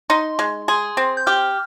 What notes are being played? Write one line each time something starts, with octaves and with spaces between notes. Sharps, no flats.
D#4 C6
G#3
G#4 C6
C4
G6
G4 F6